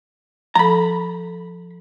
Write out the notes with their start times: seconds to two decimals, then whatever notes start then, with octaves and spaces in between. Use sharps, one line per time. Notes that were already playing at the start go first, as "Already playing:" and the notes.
0.55 F3 A4 A#5 B5